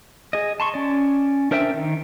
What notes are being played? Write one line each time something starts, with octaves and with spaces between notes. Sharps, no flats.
G#4 D#5
A5 C6 C#6
C#4 D5
D4 A#4 C5 E5 G5
D#3